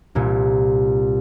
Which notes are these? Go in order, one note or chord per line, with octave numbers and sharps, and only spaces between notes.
C2 A#2